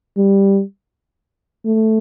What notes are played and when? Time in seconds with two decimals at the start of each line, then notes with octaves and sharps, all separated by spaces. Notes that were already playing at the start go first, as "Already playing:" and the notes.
0.17 G3
1.65 A3